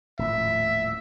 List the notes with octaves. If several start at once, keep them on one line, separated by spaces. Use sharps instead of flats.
D#1 A2 F3 E5